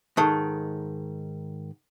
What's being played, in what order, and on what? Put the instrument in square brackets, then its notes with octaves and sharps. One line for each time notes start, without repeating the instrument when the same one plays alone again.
[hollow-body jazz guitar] G#2 D#3 [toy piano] A4 A5 C#6